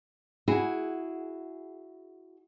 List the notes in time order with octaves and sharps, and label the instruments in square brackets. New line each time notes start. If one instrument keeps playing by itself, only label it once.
[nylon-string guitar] E4 F#4 G#4